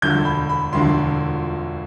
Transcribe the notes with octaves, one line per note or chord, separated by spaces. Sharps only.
E1 D2 D3 F3 G6
B5
B5
E1 D2 D3 F3 C6